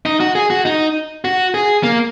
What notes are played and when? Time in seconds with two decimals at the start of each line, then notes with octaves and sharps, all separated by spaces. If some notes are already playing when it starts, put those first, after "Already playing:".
0.05 D#4
0.20 F#4
0.35 G#4
0.50 F#4
0.65 D#4
1.25 F#4
1.54 G#4
1.83 A#3